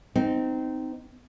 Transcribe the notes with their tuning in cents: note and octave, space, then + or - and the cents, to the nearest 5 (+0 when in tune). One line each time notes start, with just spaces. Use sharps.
C4 -20 D#4 +0